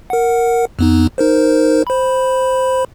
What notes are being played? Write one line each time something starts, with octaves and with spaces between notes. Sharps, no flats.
A#4 F#5
F2 B3 D#4
D#4 A#4 C5
C5 B5